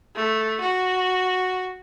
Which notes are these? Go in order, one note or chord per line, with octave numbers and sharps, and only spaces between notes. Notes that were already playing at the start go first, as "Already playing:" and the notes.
A3
F#4